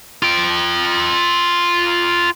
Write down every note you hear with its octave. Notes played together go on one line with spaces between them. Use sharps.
F4 G5